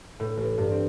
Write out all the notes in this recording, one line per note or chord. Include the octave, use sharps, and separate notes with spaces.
A2
A1
G2
C4